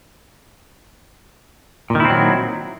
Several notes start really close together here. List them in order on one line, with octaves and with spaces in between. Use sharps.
A#2 D#3 E4 C4 F#3